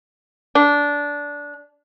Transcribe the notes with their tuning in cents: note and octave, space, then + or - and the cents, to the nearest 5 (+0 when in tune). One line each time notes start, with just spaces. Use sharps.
D4 -15